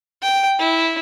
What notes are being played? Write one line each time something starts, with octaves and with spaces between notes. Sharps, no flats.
G5
E4